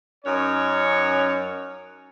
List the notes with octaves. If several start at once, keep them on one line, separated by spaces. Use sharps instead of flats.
F#2 C#4 D#4 C#5